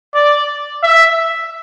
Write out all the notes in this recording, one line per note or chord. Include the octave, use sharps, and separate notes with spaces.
D5
E5